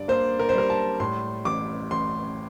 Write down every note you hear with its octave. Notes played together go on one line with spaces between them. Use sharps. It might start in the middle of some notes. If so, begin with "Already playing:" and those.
Already playing: G2 D3 D5
A#3 C5
A#4
C5
G3 A#4
A5
A2 C6
A1 D6
A1 C6